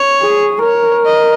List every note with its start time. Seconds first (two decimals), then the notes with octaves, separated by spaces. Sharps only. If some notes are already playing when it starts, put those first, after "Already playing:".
Already playing: C#5
0.22 G#4
0.64 A#4 C#5
1.06 D#5